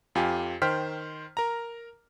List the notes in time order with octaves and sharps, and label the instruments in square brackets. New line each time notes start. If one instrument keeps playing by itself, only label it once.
[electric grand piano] F2 F4 G4 G#5
D#3 C5 G5 F6 B6
A#4 A#5